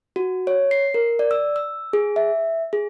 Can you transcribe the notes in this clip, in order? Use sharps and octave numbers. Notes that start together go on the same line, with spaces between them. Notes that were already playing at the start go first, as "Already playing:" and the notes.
F#4
C#5
C7
A#4
D5
E6
E6
G#4
E5
G#4